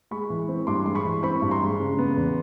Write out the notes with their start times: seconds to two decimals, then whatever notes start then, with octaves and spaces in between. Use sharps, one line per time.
0.11 G#3 B5 C#6
0.30 E3
0.49 C4
0.67 G2 C6 D6
0.86 G#3 C6
0.95 B5 C#6
1.05 E3
1.23 C4 B5 C#6
1.42 G2
1.51 A#5 C6
1.61 G#3
1.80 C#3
1.98 B3
2.17 E2